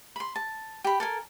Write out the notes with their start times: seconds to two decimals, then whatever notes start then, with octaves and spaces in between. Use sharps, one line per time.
0.16 B5 C6
0.36 A5
0.84 G4 B5
1.00 A4 A#4 G#5